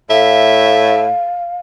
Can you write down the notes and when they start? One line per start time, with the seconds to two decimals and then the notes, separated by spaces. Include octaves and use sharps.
0.10 A2 E5 F5